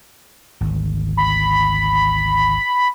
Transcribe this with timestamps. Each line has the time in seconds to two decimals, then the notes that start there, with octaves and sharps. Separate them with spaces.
0.61 G#1 D2
1.17 B5